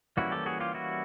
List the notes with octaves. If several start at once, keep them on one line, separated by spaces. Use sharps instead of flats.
E3 G3 A#3 C#4 E4 F#4
G4 A4
F#4 G#4
F4 G4
E4 F#4